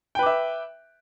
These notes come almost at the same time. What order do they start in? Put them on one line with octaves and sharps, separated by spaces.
G5 B4 D6 E5